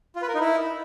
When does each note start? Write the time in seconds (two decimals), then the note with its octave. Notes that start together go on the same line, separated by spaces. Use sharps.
0.16 F4
0.22 B4
0.28 A#4
0.35 D#4
0.41 E4